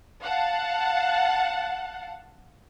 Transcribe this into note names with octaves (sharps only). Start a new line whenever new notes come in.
F5 F#5 A5